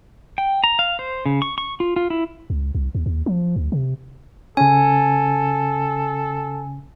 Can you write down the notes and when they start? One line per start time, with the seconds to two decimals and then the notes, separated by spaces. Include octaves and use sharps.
0.38 G5
0.64 A#5
0.79 F5
0.99 C5
1.26 C#3
1.42 C#6
1.58 C#6
1.80 F4
1.96 F4
2.10 E4
2.50 C#2
2.75 C2
2.95 D#2
3.06 D#2
3.26 F3
3.56 D2
3.72 C3
4.57 C#3 C#4 A4 G#5